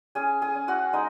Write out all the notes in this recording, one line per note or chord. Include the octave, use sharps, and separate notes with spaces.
C#4 G#4 G#5
G#4 G#5
C#4
F#4 F#5
G#3 D#4 D#5